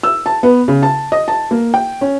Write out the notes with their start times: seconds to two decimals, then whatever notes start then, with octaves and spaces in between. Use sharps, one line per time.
0.03 E6
0.26 A5
0.43 B3
0.68 C#3
0.83 A5
1.12 D#5
1.28 A5
1.51 A#3
1.74 G5
2.01 C#4